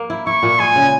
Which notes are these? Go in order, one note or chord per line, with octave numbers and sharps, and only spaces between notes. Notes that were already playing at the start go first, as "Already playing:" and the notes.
Already playing: A#3
E4
E4 C#6
A#2
G#3 G#5
C#3